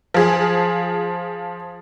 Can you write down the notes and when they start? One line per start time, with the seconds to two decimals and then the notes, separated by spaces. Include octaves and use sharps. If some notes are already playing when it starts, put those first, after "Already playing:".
0.14 F3 G#4